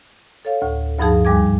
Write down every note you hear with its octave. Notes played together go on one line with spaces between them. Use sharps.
A4 C#5 F5
D2 A2
D2 G2 F3 D#4 G#4 A5
D#2 G#2 G3 G#5 D6 G#6